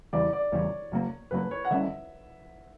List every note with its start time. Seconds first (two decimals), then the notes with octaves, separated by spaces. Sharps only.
0.13 E2 C#3 E3 G3 D5
0.33 D5
0.52 E2 C#3 E3 G3 C#5
0.92 F#2 C#3 F#3 A#3
1.31 F#2 C#3 F#3 A#3 B4
1.51 C#5
1.65 F#5
1.71 D3 G3 C#4 E5